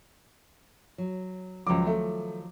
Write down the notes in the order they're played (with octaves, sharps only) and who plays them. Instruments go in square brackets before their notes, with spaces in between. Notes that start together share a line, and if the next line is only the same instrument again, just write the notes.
[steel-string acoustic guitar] F#3
[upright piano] C#2 D6 [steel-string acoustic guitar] D#3 F3 F#3
[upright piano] A3